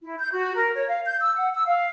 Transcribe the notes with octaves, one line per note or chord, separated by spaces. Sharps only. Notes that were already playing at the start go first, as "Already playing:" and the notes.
E4
G6
F#4
A#4
C#5
F5
G6
E6
F#5
E6
F5